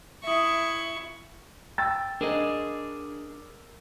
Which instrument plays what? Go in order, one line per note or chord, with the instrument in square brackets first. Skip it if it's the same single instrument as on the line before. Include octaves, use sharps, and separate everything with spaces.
[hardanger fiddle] E4 C#6 [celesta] E5 D#6
[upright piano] G5 E6 A6
[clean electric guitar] D4 G#4 D#5 [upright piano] A#4